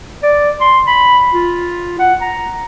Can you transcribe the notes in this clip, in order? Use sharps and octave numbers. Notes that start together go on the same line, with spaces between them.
D5
C6
B5
F4
F#5
A#5